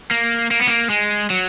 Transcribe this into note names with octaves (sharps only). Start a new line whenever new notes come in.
A#3
A#3
B3
A#3
G#3
F#3